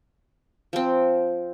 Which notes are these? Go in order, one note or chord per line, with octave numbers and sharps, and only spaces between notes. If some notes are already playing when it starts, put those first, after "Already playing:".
F3 C4